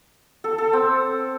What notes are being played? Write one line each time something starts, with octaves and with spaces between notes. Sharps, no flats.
A4
A4
C4